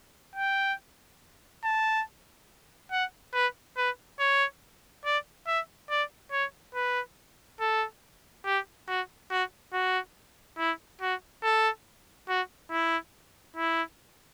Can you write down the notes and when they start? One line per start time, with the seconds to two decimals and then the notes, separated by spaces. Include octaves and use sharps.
0.35 G5
1.64 A5
2.91 F#5
3.34 B4
3.77 B4
4.19 C#5
5.05 D5
5.47 E5
5.90 D5
6.32 C#5
6.75 B4
7.60 A4
8.46 G4
8.88 F#4
9.30 F#4
9.73 F#4
10.58 E4
11.01 F#4
11.43 A4
12.28 F#4
12.71 E4
13.56 E4